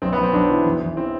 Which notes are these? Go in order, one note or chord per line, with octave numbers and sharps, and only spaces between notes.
B1 C4
B3
B1
C4
B1 D4
E3
E2
E2
E3 C4